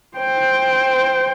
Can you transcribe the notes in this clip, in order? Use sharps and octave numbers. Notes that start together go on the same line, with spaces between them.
C5 G5